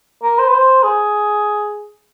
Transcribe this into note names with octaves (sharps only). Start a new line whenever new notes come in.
A#4
C5
B4
C5
G#4